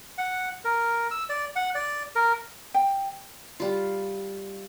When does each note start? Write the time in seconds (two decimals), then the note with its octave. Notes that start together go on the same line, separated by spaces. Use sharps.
0.18 F#5
0.65 A#4
1.11 E6
1.29 D5
1.56 F#5
1.75 D5
2.16 A#4
2.74 G5
3.60 G3 F4